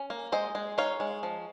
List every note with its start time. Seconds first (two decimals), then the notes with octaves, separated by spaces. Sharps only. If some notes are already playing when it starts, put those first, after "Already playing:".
Already playing: C#4
0.10 A#3
0.32 G#3 C5 D#5
0.55 G#3
0.78 D#4 C#5 F5
1.00 G#3
1.23 F3